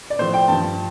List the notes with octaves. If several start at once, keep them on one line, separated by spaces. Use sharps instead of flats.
D5
A2 F3 C5
G5
G2 F3 A5